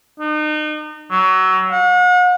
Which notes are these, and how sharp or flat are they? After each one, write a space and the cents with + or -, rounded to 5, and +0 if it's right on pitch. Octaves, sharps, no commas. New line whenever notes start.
D#4 -35
F#3 +20
F#5 -40